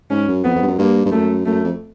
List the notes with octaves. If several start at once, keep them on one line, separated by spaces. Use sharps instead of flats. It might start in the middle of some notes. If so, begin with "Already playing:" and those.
G#2 C#4
F#2
F2 B3
F2
G2
F#2
G2 A#3
G2
F#2 A3
F#2 A3
F2